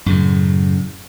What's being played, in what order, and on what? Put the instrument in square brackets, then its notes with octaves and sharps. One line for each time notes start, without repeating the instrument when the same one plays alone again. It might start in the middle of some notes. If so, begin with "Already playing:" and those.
[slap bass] F#2 A2 C#3